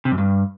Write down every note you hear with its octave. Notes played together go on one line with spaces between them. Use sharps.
C3
F#2
G2